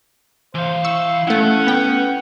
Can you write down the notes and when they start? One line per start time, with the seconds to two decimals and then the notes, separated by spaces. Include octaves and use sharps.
0.55 E3 C5 F5
0.84 E4 C#6 E6
1.27 A3 C#4 E4 F#5
1.67 B3 G5